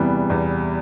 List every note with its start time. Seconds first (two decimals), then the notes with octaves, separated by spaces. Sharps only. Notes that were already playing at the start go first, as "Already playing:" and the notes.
Already playing: E2 C3 E3 G3 B3
0.30 E2